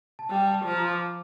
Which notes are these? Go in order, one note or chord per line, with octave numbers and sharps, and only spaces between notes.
A5
G3 G5
A5
F3 A5
A#5
C6
D6